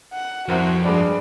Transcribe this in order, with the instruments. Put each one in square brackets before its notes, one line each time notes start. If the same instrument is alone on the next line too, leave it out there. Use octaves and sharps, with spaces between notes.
[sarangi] F#5
[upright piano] C2 C4 A#4 [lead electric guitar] F2 [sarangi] F#4
[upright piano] G2 G#3 [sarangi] D5